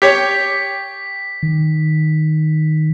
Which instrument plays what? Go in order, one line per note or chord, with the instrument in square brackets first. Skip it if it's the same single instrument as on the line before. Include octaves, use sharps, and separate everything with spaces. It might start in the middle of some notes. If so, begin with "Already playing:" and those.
[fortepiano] G4 C#5 [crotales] B6
[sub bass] D#3